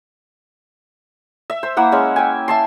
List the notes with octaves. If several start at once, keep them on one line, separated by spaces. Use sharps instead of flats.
E5
C5
A#3 E4 F#5 D6
G#3 C#4
G5 G#5
E5 A5 C6